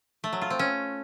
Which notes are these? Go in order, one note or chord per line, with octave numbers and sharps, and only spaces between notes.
A3
F#3
F4
C4
C#4